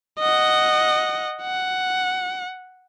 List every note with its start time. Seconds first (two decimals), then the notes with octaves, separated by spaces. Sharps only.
0.19 D#5 F#5
1.43 F#5